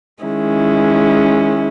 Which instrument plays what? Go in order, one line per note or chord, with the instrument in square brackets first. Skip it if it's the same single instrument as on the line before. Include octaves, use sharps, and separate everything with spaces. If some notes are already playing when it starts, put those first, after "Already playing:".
[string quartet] D#3 G#3 C#4 E4